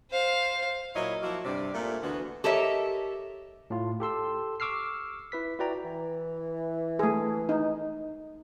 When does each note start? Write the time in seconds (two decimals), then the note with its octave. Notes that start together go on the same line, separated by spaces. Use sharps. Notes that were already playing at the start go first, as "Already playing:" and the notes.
0.10 C5 F5
0.96 A#2 F#3 E4 C#5 D#5
1.23 F3 F#3 A#3 E4 F#4
1.45 G2 C3 D5
1.75 A#2 A3
2.03 D2 D3 E3 B3 D4 F#4
2.44 G4 A4 A#4 C#5 D#5 E5
3.70 A2 F4
4.00 G4 A4 C6 E6
4.60 C#6 D6 E6 F6 C7
5.32 E4 B4 B6
5.59 E4 F#4 B4 D5 G5 A#5
5.84 E3
6.99 A3 G#4
7.49 D#4